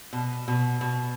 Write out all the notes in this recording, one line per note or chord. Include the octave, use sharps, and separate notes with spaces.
B2
B2
B2